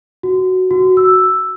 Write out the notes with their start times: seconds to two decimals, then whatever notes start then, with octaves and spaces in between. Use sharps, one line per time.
0.23 F#4
0.71 F#4
0.97 E6